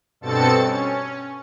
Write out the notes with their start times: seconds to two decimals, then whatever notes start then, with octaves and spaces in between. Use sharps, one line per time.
0.21 G2 B2 C4 A4 A6 C#7
0.62 C#4